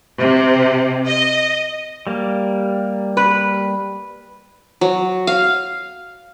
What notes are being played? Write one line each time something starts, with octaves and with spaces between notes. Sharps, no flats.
C3
D#5
G3 A#3
B4
F#3
F5